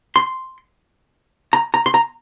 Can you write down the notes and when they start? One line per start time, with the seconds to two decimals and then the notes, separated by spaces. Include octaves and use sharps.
0.16 C6
1.53 A#5
1.74 A#5
1.86 C6
1.94 A#5